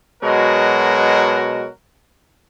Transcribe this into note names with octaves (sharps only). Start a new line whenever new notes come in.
B2 F#3 G#3 F#4 A#4